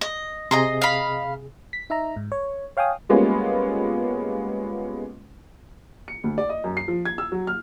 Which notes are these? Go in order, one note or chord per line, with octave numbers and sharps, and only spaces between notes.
D#5
C3 G#4 D#5 A#5 C6
F5 B5
B6
D#4 E5 A#5
G#2
C#5
C#5 F5 G5 G#5 D#6
G3 G#3 A#3 B3 C#4 F4
C#7
D2
D5
D#5
F#2
C7
F3
G#6
E6
F#3
F6